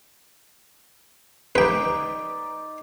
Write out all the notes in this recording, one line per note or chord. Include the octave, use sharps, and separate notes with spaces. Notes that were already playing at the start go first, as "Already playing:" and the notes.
D#4 B4 D5 G5